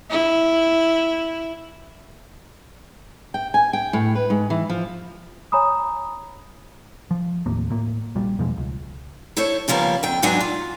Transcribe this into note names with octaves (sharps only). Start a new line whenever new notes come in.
E4
G5
G#5
G5
A2
B4
G#2
E3
F3
C#5 G#5 A#5 B5 D#6
F3
D#2 A2 A#3
A2 A#3
A#1 A#2 G3
E2 B2 F3 G#3
C#2
E4 A4 C5 C#5
C#3 F3 G3 A#3 B3
F2 G5
E2 G#2 F#3 B3 D4 G#5
F4